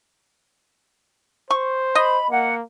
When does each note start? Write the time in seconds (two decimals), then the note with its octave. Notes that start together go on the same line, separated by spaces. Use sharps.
1.51 C5 C#6
1.95 D#5 B5
2.30 A#3 F#5